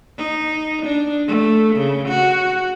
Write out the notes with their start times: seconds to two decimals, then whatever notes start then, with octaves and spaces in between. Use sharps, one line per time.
0.18 D#4
0.86 D4
1.28 A3
1.76 C#3
2.09 F#4